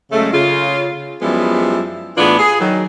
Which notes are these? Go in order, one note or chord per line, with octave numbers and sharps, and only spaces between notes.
F#2 C#3 G#3 A3
C#3 F4
F#2 F3 G3 G#3 B3 E4
A2 E3 B3 D4 F4 G#4
G#4
D#3 F#3